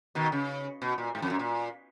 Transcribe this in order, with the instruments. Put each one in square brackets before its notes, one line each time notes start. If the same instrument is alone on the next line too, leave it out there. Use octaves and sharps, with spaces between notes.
[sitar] B2 D#3
C#3
B2
A#2
G#2
F2
F#2
A#2